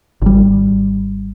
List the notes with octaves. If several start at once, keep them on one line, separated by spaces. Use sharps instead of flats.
G#1 G3